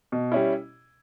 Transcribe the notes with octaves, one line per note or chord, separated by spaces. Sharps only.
B2
G3 C#4 E4